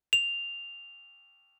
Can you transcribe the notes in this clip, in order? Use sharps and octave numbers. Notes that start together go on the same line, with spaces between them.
F7